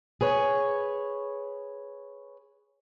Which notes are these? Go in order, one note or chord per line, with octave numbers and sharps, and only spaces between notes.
G#4 B4 C#5